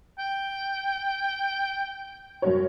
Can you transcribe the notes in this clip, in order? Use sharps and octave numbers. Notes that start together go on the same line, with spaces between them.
G5
F#2 F#4 C#5